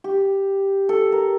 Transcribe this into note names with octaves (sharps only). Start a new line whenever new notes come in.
G4
A4
A#4